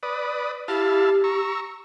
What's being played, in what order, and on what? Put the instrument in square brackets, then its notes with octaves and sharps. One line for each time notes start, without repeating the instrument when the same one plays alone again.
[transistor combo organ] B4 D5 D#6
[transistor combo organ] E4 F5 A5 [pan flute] G4
[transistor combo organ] A#5 C#6 E6